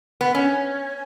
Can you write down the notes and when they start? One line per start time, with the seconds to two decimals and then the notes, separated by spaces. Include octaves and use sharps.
0.21 B3
0.35 C#4